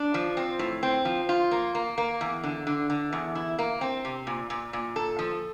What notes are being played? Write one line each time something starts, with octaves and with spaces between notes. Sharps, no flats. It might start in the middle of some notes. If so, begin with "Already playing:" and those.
Already playing: D4
F3
C4
A2
C4
F3
F4
A#3
A#3
A#3
E2
D3
D3
D3
E2
E4
A#3
C4
C3
A#2
A#2
A#2
A4
F3